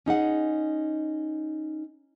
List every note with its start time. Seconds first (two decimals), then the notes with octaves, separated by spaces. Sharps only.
0.06 C#4 D#4 G#4 F#5